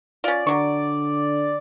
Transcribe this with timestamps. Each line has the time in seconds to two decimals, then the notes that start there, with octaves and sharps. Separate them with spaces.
0.24 C#4 F4 D5
0.47 D3 F#3 C#6